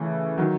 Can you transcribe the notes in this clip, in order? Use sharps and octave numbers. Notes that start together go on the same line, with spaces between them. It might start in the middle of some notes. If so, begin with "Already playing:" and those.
Already playing: C#3 E3 A3
D#3 F#3